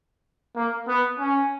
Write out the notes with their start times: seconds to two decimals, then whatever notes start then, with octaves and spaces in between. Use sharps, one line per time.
0.56 A#3
0.88 B3
1.20 C#4